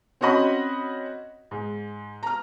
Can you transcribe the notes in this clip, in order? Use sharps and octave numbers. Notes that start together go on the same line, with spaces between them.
C4 C#4 F#4 D#5 B5
G#2
A#5 F6